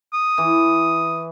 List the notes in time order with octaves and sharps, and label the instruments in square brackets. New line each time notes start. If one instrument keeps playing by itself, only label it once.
[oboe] D#6
[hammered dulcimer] E3